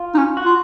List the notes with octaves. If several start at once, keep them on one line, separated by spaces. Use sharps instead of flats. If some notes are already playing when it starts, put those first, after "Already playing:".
Already playing: F4
D#4
C#4
F#4
F4